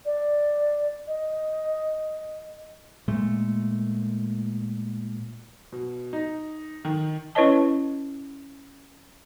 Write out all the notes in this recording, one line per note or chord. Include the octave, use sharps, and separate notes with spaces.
D5
D#5
A#2 G#3 A3
B2
D#4
D#3
C#4 E4 B4 C#5 D#5 A5